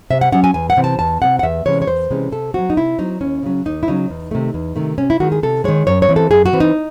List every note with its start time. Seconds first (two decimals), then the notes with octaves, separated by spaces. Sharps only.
0.10 C3 E5
0.21 F#5
0.32 F#3 C#4 F#5
0.44 G#5
0.54 E2 G#5
0.70 F#5
0.77 C3 E3 C4
0.84 A5
0.99 E2 A5
1.22 C3 E3 C4 F#5
1.39 F#5
1.43 E2 E5
1.65 C3 E3 G#3 C#4 C#5
1.82 C#5
1.87 E2 C5
2.11 C3 E3 G#3 C#4
2.32 C3 A4
2.54 F#3 C4 F#4
2.70 D#4
2.77 C3 E4
2.98 F#3 C4 D#4
3.21 D#2 C#4
3.43 C#3 F#3 C#4
3.65 D#2 D#4
3.83 E4
3.87 C#3 F#3 C#4 D#4
4.10 E2
4.31 C3 D#3 A3
4.54 E2
4.76 C3 D#3 A3
4.98 C3 C#4
5.10 E4
5.20 D#3 G#3 F#4
5.32 G#4
5.43 C3 A4
5.64 D#3 G#3 C#5
5.87 F#2 C#5
6.02 C#5
6.09 E3 C4
6.16 A4
6.31 F#2 G#4
6.45 F#4
6.53 E3 C4
6.60 D#4